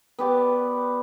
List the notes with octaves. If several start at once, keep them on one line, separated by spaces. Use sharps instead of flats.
B3 G4 D5